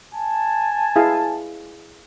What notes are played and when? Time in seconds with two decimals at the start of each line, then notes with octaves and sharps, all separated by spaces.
0.14 G#5 A5
0.96 E4 G#4 F5